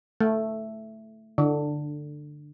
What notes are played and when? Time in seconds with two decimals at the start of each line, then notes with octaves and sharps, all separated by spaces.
0.21 A3
1.38 D3